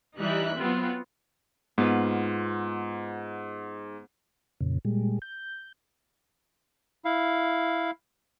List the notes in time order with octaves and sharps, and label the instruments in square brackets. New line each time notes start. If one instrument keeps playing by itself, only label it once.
[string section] E3 G3 D#4 E4 E5 F#6
F#3 B3 C4 F4
[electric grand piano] G#2 [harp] B3 F4 B4
[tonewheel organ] F2 A#2 C#3
A#2 G3 G#3
G6
[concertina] E4 F5